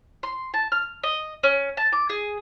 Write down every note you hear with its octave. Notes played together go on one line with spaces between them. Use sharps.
C6
A5
F6
D#5
C#4
A5
D6
G#4